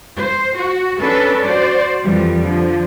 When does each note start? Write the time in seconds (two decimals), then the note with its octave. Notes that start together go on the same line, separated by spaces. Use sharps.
0.17 C5
0.57 F#4
1.00 C#4 D4 A4 B4
1.44 F#4 C5 D5
2.03 F2 E3 F3 G3
2.43 D3 F3